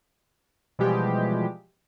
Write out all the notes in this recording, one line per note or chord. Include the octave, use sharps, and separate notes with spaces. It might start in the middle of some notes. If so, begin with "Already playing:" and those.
B2 E3 F3 G3 G#3 G4